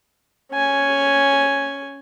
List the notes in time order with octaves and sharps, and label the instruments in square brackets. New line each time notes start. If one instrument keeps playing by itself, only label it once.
[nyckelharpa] C#4 G#5